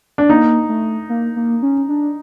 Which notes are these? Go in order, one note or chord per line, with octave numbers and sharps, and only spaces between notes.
D4
A#3 D#4
A3
A#3
A#3
C#4
D4